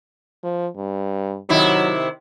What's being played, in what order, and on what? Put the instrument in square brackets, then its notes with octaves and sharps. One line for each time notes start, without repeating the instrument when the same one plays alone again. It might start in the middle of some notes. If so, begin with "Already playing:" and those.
[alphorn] F3
G2
[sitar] C3 D#3 E4 [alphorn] F#3